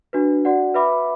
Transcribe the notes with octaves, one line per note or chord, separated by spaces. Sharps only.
D4 F#4 B4
F#4 D5 F#5
B4 E5 B5 D6